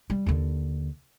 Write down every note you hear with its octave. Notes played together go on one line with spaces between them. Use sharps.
G3
D#2 D3